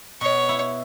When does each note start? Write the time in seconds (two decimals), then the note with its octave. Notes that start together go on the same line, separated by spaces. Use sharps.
0.21 B2 C#5
0.49 E4